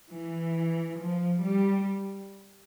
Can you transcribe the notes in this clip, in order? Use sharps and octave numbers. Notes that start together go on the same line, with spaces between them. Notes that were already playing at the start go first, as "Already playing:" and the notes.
E3
F3
G3